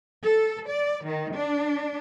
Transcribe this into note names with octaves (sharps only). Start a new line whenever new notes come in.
A4
D5
D#3
D4